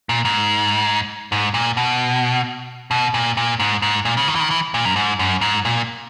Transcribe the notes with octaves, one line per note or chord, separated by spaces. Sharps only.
A#2
G#2
G#2
A#2
B2
B2
A#2
A#2
G#2
G#2
A#2
C#3
D#3
E3
D#3
E3
A#2
F#2
G#2
F#2
G#2
A#2